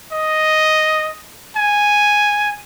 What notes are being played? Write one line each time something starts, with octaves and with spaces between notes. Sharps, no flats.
D#5
G#5